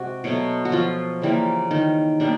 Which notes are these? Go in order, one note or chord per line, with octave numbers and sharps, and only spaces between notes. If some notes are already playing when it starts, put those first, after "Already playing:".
Already playing: C3 G#3 F#4
B2 F#3 A3
F#4
F3 F4
C#3 E3 G3 A#3
D#3 D#4
B2 G3 A#3 D4